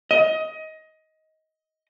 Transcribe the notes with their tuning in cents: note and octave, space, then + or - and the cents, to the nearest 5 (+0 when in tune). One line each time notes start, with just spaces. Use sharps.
D#5 +20